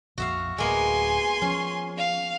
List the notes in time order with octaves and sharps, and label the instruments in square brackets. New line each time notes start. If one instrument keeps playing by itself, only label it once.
[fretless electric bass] A#1 F2 A#2 [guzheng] F#4 E5 F5
[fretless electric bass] D1 [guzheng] G#3 A#3 B3 [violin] G#5 C6
[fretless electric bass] F3 [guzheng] C#4
[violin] F5